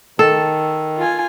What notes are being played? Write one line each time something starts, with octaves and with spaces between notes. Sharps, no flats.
D#3 A4
F4 G#5